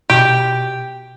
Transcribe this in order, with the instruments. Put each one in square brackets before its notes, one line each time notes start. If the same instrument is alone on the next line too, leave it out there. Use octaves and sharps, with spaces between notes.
[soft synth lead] B2 [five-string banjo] G4